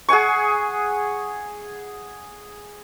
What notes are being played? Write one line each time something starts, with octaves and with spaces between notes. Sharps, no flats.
G#4 F#5 G#5 C#6